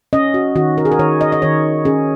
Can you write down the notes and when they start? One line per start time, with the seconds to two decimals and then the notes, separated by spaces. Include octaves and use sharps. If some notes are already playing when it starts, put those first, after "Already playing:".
0.13 C#4 D#5
0.34 F#4
0.55 D#3 F#4
0.78 A#4
0.85 G#4
0.92 A#4
0.99 D#3 C#5
1.21 D#5
1.32 D#5
1.42 D#3 C#5
1.85 C#4 G#4